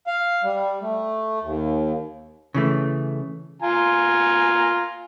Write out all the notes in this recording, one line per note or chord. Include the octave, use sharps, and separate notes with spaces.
F5
G3
A3
D#2
C#3 E3 A3
F4 G#5 A#5